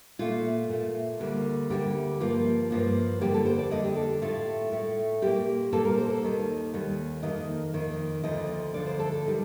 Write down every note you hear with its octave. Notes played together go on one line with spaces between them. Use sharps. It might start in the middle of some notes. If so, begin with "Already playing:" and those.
A#2 A3 F4
A#2 A3
D2 D3 G3 A#3
D2 D3 G3 A#3 G4
G2 F3 A#3 F4
G2 F3 A#3
F2 D3 G3 A#3 G4
A4
C5
D5
F2 D3 G3 A#3 D#5
G4
A4
A2 A3 F4
A2 A3
A#2 G3 A#3 G4
A#2 G3 A#3 A4
A#4
C5
A4
D#2 D#3 G3
D#2 D#3 G3
F2 D#3 A#3 D#5
F2 D#3 A#3
D2 D3 F3 D#5
D2 D3 F3 D5
C5
A4
A4
D#3 G3